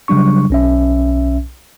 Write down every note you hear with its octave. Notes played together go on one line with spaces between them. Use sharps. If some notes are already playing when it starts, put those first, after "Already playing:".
C#3 F#3 G3 D4 C#6
B1 C#4 E5